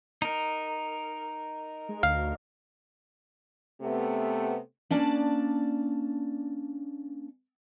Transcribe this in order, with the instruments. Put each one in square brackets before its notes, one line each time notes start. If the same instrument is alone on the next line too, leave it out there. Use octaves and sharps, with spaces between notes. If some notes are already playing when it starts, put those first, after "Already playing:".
[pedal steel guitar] D#4 A#4
[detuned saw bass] G#3
[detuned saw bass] D2 [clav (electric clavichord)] F5
[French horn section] C3 A3 B3
[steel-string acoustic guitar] A#3 C#4 D4 D5 A5